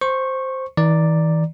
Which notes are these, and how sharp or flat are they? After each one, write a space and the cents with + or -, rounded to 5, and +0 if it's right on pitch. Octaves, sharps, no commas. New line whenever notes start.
C5 +0 C#6 -15
E3 -45 D5 +0 A#5 +0